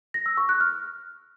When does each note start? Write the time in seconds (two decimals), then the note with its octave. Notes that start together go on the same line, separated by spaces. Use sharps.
0.14 A#6
0.26 E6
0.37 C#6
0.49 F#6
0.61 F6